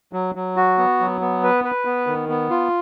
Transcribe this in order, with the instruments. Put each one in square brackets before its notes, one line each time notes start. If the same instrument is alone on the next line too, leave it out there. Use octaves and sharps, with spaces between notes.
[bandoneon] F#3
F#3
F#4
B3
F#3
B3
B4
B4
B3
D#3
B3
F4